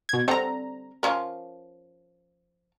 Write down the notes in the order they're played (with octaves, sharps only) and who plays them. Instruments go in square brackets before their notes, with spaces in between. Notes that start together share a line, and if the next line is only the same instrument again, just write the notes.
[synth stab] B2 G#6
[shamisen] D3 G3 A4 [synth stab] C4 A#5
[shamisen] F3 C#4 A#4